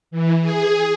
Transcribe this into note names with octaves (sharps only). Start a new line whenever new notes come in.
E3
G#4